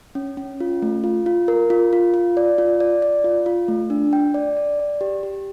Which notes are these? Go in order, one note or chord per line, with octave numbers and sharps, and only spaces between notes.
C#4
C#4
F4
A3
F4
F4
A#4
F4
F4
F4
D5
F4
D5
D5
F4
F4
A3
D4
G5
D5
D5
D5
G4
G4